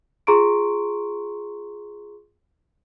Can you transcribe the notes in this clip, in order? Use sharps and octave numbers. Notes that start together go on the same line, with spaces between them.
F4 G#4 A#5 C6 C#6 D7